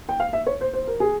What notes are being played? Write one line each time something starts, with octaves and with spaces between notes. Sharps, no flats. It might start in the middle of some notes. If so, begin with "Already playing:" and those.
G5
F5
E5
C#5
C5
C5
A#4
G#4